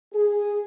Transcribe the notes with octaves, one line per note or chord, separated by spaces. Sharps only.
G#4